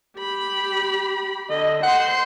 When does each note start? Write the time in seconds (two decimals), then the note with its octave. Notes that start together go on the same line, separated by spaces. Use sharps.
0.17 G4 B5
1.50 D3 D#5
1.83 C5 F#5 C6